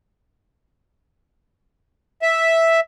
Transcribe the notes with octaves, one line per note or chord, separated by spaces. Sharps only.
E5